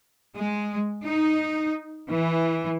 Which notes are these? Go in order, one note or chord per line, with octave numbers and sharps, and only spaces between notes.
G#3
D#4
E3